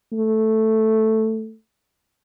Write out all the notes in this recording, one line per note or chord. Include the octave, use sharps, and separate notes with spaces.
A3